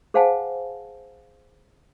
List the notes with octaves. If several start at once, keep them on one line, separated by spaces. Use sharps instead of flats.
G#4 C5 F5 F#5 G#5 A5